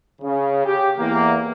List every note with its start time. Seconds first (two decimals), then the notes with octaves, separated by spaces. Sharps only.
0.22 C#3
0.64 G4
0.98 E2 A#3